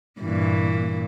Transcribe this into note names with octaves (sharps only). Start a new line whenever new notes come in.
G2 A#2 E3